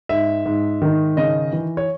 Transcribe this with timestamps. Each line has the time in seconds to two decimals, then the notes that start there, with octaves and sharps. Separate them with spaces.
0.09 G#2 E5
0.46 G#2
0.82 D#3
1.17 C#3 D#5
1.53 E3
1.77 C#5